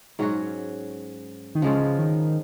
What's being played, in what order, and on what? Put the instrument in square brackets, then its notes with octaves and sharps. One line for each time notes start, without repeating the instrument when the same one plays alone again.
[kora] G#2 F#3 C#4 F#4
[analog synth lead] D#3
[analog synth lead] C#3 [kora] F3 G#3 C#4 F4
[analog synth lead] D#3